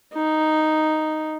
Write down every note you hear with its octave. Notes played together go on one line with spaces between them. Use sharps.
D#4